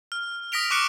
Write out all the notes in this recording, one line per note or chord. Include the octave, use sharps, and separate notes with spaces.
F6
D#6 A#6 B6 D7 F7
C#6 D6 F6 F#6 C#7 D7